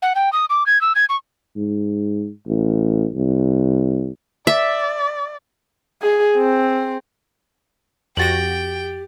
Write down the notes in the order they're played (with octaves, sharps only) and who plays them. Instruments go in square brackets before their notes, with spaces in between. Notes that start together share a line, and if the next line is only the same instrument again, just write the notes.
[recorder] F#5
G5
D#6
D6
G#6
E6
G#6
C#6
[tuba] G#2
A1
C2
[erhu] D5 [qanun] E5
[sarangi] G#4
C4
[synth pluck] F2 F#4 A#6 [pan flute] G4 [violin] G5 [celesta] A6 F#7